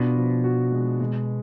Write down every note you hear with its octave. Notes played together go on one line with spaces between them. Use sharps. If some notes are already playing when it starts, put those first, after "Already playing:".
Already playing: B2 D4 F4
F3
F#4
G#3
G#3